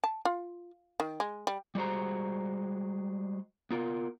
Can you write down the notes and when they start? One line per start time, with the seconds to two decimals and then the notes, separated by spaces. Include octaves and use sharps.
0.04 A5
0.25 F4
1.00 D#3
1.20 G#3
1.47 G3
1.75 G3 G#3 F#4 C5 A#5
3.70 B3 F4 A#4